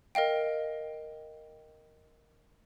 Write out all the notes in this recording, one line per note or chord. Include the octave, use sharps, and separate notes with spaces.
A#4 D#5 F5 G5